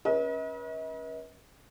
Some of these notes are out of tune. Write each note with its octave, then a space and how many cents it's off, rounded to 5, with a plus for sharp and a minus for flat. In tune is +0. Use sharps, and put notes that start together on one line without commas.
C#4 +0 B4 -40 D#5 +45